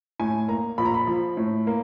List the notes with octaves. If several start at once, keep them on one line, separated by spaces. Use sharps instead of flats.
A2 G#5
A#3 A#5
A#1 B5
A#5
B5
F3
A2
A#3